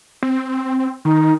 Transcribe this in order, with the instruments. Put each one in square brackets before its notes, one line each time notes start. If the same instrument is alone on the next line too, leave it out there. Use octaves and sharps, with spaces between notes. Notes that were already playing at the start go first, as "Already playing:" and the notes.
[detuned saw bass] C4
[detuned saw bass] D#3 [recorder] D#4